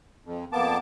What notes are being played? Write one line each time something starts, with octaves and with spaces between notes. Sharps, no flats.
F2
F2 A#3 B3 A5 D6